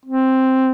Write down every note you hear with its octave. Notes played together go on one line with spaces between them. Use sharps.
C4